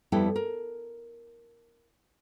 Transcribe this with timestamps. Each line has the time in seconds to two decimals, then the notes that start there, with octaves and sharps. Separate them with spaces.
0.12 F2 G3 B3 E4 A4 G5
0.36 A#4